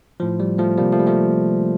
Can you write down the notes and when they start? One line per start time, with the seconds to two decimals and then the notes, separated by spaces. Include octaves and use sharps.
0.20 A2 F3
0.40 G3
0.58 F3 A3
0.77 C3 F3 G3 A#3
0.92 F3 A3
1.00 G3
1.06 F3 A3